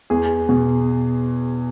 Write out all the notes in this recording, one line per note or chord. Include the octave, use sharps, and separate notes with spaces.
E2 G#4
B2